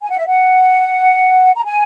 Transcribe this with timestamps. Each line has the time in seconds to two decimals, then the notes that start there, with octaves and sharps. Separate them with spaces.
0.02 G#5
0.10 F#5
0.17 E5
0.27 F#5
1.56 A#5
1.64 G#5